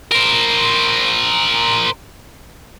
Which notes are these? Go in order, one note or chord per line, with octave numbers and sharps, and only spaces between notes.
A#4 C5